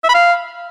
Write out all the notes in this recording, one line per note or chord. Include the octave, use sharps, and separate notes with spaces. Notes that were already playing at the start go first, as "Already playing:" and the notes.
E5
B5
F5